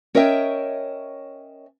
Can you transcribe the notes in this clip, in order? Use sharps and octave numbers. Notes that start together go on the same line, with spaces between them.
C#4 A#4 C#5 D#5 E5 G5